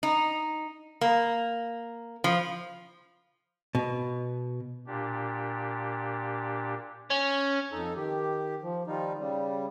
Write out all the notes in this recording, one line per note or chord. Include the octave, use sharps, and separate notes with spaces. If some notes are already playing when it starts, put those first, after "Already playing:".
D#4
A#3
F3
B2
A#2 D4 G4
C#4
F2 D#4 A4
D#3 G4
F3
D#3 F3 G3 D#4 F4
C#3 G3